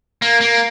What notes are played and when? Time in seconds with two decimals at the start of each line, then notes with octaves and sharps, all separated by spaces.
0.22 A#3
0.41 A#3